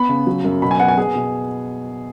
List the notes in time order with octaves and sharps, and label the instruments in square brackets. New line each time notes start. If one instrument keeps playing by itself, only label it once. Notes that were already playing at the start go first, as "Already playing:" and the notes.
Already playing: [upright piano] B3 B5
C#3
F#3
F#2
B2 B5
G#5
B3 F#5
G#5
B3 G#4
B2